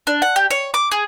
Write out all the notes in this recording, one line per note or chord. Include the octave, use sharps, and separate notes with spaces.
D4
F#5
G4
C#5
D6
G#4